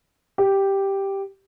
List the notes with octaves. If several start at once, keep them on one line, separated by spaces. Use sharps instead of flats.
G4